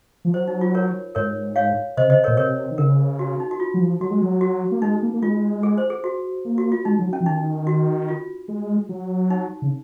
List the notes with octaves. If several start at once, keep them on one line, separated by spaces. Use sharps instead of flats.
F3
F#3 C5
D#4
F4
A#4 C#5
G#2 A#4 C#5
C#5 F5
C3 C5 D#5
C#3
C5 D#5
A#4 C#5
A#2
C3 A#4 C#5
D#3
C#3 A#4
F#4
D#4
F#4
F4
F#3
F3
F#3 F#4
G#3
F#3
F#4
A#3
G#3 D#4
A#3
A#3
G#3 F4
G#4
C5
G#4
F#4
A#3
F#4
F4
G#3 D#4
F#3
C#4
F3
D#3 D#4
F#4
F4
G#3
F#3
D#4
C#3